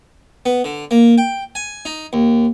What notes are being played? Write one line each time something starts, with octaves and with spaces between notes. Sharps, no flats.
B3
D3
A#3
G5
G#5
D#4
D#2